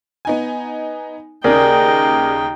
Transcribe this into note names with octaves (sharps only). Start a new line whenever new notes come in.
B3 D#4 G#5
D#2 C#3 D#4 G#4 A#4 D5 G5